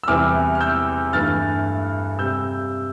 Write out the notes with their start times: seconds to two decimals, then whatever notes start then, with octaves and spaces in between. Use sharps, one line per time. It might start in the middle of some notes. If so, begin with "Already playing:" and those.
0.04 E6
0.08 E2 C3 E3 G3 D6 F6
0.55 F6
0.61 E6 G6
1.13 G2 E3 A3 F6 A6
2.19 C3 G3 E6 G6